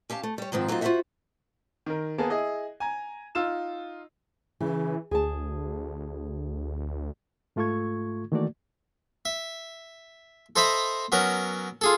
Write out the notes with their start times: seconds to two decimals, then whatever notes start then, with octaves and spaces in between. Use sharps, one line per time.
0.10 C#4 G4 F5 A5
0.23 A3
0.38 G3 C#5
0.52 G#2 D#3 F3 C4
0.68 F#3 A#3 C4 D#4 F4
0.81 F4 F#4 A4 C5 E5 F#5
1.86 D#3 A#4
2.18 A#3 B3 G#4 A5
2.30 E4 G#4 D#5
2.80 G#5 A#5
3.35 D#4 F4 E6 E7
4.61 C#3 E3
5.11 D2 G#4 A5
7.56 G#2 A3 F4 A4 C#6 G#6
8.32 D#3 E3 A3 A#3 F#4 D5
9.25 E5
10.56 A4 C5 D#5 E5 A#5 B5
11.12 F#3 B3 C#4 A#4
11.81 F4 G#4 A4